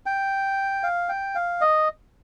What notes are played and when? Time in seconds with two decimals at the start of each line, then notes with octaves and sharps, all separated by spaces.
0.06 G5
0.83 F5
1.09 G5
1.35 F5
1.61 D#5